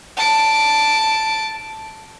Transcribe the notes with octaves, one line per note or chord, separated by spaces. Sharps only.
A5 D7